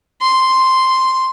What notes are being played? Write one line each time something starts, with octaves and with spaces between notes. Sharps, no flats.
C6